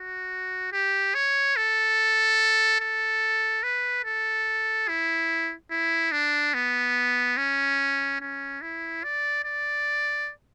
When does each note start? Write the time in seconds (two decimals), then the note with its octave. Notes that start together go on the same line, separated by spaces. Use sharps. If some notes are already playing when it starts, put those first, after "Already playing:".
Already playing: F#4
0.72 G4
1.15 C#5
1.57 A4
2.81 A4
3.63 B4
4.05 A4
4.89 E4
5.71 E4
6.12 D4
6.54 B3
7.38 C#4
8.21 C#4
8.62 E4
9.04 D5
9.44 D5